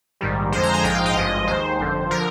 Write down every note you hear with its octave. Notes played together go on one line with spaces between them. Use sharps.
A#1 G#2 D#3 G3
F2 D3 F3 G#3 C5
A#5
G#5
A#1 G#2 F3 G#3 G5
F5
D#5
G#1 G2 F3 G#3
D#2 D#3 G#3 C5
G1 F2 D3
D3 F3 A#4